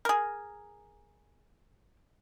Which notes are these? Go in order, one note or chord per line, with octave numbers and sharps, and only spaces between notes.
G#4 A#4